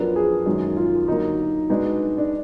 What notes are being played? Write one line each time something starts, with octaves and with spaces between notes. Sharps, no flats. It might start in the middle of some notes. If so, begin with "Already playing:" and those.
Already playing: F#2 F3 B3 D4 A#4
G#4
F#2 D#3 G#3
F4
D3 F#3 A#3 D#4
B2 G#3 B3 D4 D#4
D4